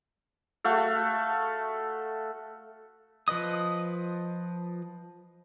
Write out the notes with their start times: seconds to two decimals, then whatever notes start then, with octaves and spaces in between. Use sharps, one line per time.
0.64 A3 F#4 F5
3.28 F3 B4 D#5 D#6